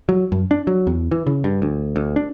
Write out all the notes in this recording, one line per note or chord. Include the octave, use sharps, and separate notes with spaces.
F#3
F#2
D4
F#3
E2
E3
C#3
G2
D2
D2
D4